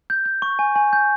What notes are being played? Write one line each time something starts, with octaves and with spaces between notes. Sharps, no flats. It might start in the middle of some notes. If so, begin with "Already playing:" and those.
G6
G6
C#6
G#5
G#5
G6